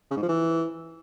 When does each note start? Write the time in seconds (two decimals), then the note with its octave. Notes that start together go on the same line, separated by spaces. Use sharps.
0.11 C#3
0.17 G#2
0.23 F3
0.28 E3